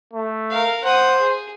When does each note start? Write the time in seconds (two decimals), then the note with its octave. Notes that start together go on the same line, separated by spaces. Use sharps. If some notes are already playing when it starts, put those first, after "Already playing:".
0.13 A3
0.51 A#4 F5
0.84 C5 F#5 D#6
1.20 G#4